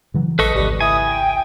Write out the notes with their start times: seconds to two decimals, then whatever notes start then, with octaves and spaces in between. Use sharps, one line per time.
0.14 C#3 E3 F#3
0.39 A1 A4 B4 D#5 C#6
0.55 G#1 C#2 G3
0.81 E4 G#5 D#6
1.06 G5